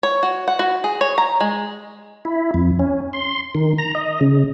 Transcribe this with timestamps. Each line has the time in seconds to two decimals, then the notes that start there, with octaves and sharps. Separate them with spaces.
0.03 C#5
0.23 F#4
0.48 F#5
0.59 F#4
0.84 G#4
1.01 C#5
1.18 A#5
1.40 G#3
2.25 E4
2.54 F2
2.79 C#4
3.13 C6
3.55 D#3
3.78 A#5
3.95 D#5
4.21 C#3